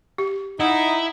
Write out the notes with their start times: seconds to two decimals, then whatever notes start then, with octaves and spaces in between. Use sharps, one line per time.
0.18 G4
0.60 D#4 E4 F#5